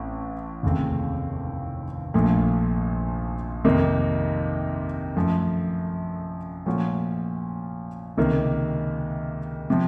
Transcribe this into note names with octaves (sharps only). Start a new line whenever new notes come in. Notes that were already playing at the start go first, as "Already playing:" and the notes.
Already playing: A1 A2 C4
F1 D#2 C#3 A3 C4
A#1 A#2 F3 A3
F2 C3 D#3 A#3 D#4
F#2 F3 A3
A#2 F3 A3 C#4 F#4
C#2 C3 D#3 A#3
C3 F3